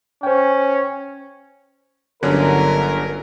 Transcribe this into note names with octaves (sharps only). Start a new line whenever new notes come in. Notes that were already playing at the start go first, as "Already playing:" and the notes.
C#4 C5 G5
G1 D3 F#3 C#4 A#4